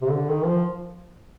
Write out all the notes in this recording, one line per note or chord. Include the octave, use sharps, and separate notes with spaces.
C3
D3
D#3
F3